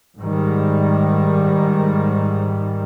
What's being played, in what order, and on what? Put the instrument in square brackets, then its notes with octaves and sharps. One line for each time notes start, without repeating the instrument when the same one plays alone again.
[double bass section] G#2 D#3 G3